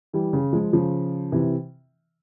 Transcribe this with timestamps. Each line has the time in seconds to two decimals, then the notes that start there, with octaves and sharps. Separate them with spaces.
0.13 E3 G3
0.33 C#3
0.53 F3 G#3
0.73 C#3 F3
1.32 C3 E3